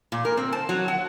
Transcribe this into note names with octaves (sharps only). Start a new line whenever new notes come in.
A#2
A#4
C4
A5
F#3
F#5